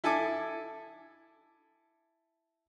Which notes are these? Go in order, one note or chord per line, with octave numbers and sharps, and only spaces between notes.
E4 A4 G#5 D6